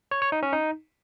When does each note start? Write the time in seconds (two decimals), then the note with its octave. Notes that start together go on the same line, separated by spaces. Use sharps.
0.11 C#5
0.22 C#5
0.32 D#4
0.43 C#4
0.53 D#4